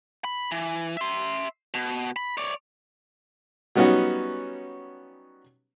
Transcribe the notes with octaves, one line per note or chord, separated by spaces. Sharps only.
B5
E3
E5 C6
B2
B5
C#5 D5
F#3 G3 B3 C#4 D#4 F#4